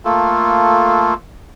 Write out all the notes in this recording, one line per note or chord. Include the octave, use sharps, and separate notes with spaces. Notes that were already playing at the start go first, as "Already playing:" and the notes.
A3 A#3 F4 A4